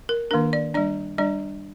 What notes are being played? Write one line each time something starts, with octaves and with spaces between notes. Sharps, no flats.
A#4
D#3 A#3 D4 A#4
D5
G3 D4 D5
G3 D4 D5